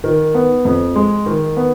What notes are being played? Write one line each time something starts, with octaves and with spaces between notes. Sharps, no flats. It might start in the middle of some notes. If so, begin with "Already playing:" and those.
D#3
B3
F2
G#3
D#3
B3